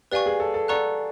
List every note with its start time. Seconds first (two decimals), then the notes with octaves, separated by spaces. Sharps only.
0.11 G4 B4 D5 F5 G#5 C#6
0.26 G#4
0.40 A4
0.54 A4
0.68 A4 D5 F#5 A#5 C#6 F#6